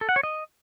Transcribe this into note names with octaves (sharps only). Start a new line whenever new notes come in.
A4
F#5
C#5
D#5